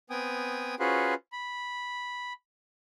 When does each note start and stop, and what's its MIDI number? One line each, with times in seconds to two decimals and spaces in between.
0.10 0.75 59
0.10 0.75 60
0.10 0.75 79
0.10 0.75 80
0.10 0.75 87
0.79 1.14 61
0.79 1.14 65
0.79 1.14 66
0.79 1.14 68
0.79 1.14 71
0.79 1.14 72
1.32 2.33 83